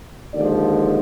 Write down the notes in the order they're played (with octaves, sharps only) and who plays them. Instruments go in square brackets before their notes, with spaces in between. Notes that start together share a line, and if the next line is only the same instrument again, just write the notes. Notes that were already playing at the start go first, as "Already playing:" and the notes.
[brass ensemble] D#2 D3 F3 G#3 D5